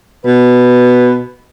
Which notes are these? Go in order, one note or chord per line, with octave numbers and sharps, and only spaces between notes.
B2 B4